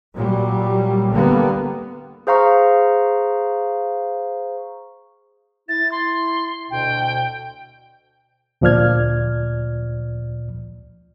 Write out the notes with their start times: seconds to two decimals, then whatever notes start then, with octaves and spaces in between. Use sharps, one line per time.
0.14 A#2 F#3 G3
1.13 D3 G3 A#3 B3
2.27 G#4 C5 F5 A#5 C#6
5.69 E4 A6
5.92 C6
6.71 D2 B2 G5
8.61 D2 A#2 F3 D5 F6 G#6